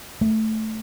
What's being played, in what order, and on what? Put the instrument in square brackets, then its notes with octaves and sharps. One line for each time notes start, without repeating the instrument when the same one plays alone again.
[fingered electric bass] A3